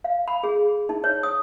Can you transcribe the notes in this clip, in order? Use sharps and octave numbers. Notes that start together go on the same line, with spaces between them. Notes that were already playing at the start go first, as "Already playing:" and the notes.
F5
B5
G#4
D#4
C#5
D#6